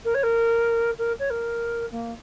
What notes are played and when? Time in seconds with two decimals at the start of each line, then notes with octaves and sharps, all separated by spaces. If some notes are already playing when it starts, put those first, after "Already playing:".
0.04 A#4
0.14 C#5
0.23 A#4
0.98 A#4
1.19 C#5
1.30 A#4
1.91 A#3